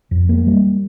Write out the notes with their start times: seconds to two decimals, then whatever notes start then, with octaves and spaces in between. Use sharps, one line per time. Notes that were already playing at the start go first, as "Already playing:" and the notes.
0.11 F2
0.29 A#3
0.47 G3